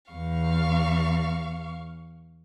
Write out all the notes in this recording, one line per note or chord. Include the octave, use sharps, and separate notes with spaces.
E2 F5 C#6